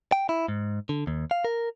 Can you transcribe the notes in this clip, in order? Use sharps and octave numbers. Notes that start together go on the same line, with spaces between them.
G5
E4
G#2
D3
D#2
F5
A#4